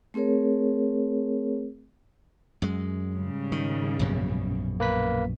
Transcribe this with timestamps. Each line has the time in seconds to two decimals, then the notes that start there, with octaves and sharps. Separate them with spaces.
0.14 A3 C4 G#4 A#4 C#5
2.62 F#2 G#3
3.14 G#2 C#3 G3
3.52 D#3
3.99 A#1 F#2 B2
4.80 A#3 B4 B6